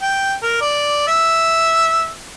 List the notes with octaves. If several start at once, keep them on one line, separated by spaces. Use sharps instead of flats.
G5
A#4
D5
E5